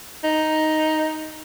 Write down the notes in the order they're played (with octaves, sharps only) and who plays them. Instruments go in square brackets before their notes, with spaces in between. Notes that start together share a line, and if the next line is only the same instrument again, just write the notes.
[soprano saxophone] D#4